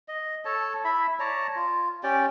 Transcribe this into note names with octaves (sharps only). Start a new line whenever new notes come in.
D#5
A4 C#5 A5
E4 E5 B5
C#5 D5 A5 A#5
F4
C#4 G4 D5 G5